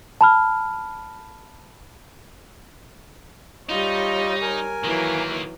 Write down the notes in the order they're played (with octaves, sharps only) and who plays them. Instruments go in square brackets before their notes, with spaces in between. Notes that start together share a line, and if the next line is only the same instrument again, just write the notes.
[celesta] A5 B5 F6
[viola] G3 C#5 [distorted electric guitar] D#4 [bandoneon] F4 D#5
[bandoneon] A#4 G#5
[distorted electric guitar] D#3 A#3 [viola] E3 F#3